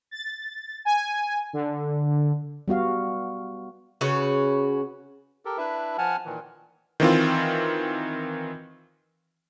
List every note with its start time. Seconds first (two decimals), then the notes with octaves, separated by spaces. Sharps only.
0.11 A6
0.85 G#5
1.53 D3
2.68 G3 B3 F#4 F5
4.01 C#3 C#4 F#4 B4
5.45 G4 A4 A#4
5.58 D4 E4 B4 E5
5.98 F3 F#5 G#5 A5 F6
6.26 A#2 D#3 E3
7.00 D#3 E3 C4 F4